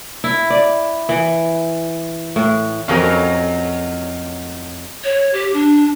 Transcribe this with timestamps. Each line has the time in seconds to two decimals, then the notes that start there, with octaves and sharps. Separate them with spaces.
0.24 E4
0.50 D5
1.09 E3
2.36 A2
2.88 F2 A2 F#3 C#4 A#4 D#5 F5
5.04 C#5
5.33 G4
5.54 D4